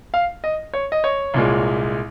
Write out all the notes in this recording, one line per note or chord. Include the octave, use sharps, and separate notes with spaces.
F5
D#5
C#5
D#5
C#5
C2 A#2 G#3